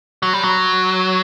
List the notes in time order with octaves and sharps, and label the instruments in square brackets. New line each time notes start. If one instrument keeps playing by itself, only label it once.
[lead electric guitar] F#3
G3
F#3